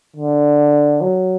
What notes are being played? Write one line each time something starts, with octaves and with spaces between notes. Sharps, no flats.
D3
F#3